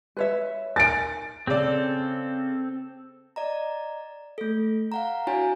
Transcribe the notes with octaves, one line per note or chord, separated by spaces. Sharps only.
B4 C#5 E5
A#4 G#5 A6 D7
C#3 C4 A4 D5
D5 D#5 A#5
A3 A4
F5 F#5 A#5
D4 E4 F#4 C#5 G#5 A#5